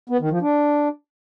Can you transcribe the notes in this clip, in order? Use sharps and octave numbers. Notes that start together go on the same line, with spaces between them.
B3
D#3
F3
D4